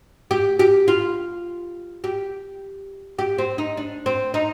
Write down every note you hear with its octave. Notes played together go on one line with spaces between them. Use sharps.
G4
G4
F4
G4
G4
C4
D#4
D4
C4
D#4